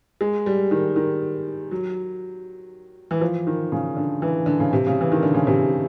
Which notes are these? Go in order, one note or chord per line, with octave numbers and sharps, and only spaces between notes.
G#3
G3
D#3
D#3
F#3
E3
F3
D#3
C#3
D3
E3
D3
C#3
C3
C#3
E3
D#3
D3
C#3
C3